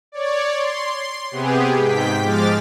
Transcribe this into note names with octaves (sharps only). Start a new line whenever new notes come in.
C#5 D5
C6
C3 B3 G4 G#4
G#2 G5 B6
F3 G#3 D6 F6 A6